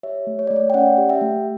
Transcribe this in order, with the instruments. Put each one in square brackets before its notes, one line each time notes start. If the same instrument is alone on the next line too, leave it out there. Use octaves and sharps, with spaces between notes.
[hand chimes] G4 C#5 E5
A3
C#5
A3 D5
C#5
G5
C#4 D5 F#5
G4
E5 G5
A3